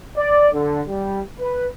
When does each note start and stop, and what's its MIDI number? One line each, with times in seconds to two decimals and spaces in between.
0.17 0.48 74
0.53 0.80 50
0.88 1.20 55
1.39 1.66 71